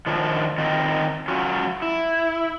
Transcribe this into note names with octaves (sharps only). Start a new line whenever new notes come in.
D#3 F3 F#3 D4 F4
D#3 C4 D#4 F4
F#3 C#4 F4 F#4
E4